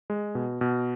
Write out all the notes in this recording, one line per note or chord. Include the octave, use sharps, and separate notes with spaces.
G#3
B2
B2